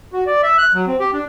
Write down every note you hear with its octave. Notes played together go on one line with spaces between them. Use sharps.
F#4
D5
E5
F#6
F#3
C4
G4
D4